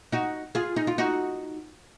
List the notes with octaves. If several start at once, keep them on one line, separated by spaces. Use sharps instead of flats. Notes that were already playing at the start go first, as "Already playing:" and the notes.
D#4 F#4
F4 G#4
D#4
F4
D#4 F#4